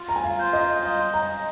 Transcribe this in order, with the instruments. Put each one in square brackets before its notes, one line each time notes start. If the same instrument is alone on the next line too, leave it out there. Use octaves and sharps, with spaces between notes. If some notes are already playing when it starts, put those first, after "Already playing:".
Already playing: [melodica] F4
[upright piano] A#5
G#5
F5
[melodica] C5
[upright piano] D#5
[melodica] D#5 [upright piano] F5
[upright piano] A#5
[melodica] D#5